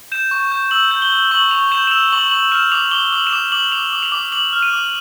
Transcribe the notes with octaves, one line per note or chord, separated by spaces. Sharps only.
G6 E7
C#6
G6
E6 F#7
G6
G7
G6
C#6 F#7
C#6 F7
G6 E7
E7
E6 F7
C#6 F#7
C#6 F#7
F6 E7
D6 F7
D6 G7
D6 F#7
E7
D6 F7
D6 F#7
D6 F7
D6
F7
D6
D6 F#7
F6
D#7
D6